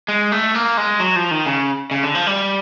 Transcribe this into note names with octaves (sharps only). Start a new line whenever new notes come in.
G#3
A3
A#3
G#3
F#3
F3
D#3
C#3
C#3
D3
F3
G3